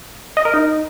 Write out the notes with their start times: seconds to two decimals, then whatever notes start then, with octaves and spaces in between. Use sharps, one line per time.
0.37 D#5
0.45 A#4
0.54 D#4